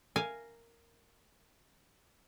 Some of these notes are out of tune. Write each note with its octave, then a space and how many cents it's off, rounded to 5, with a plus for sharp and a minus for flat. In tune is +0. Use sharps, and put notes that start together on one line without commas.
A#4 -5 F5 -5 G#5 +0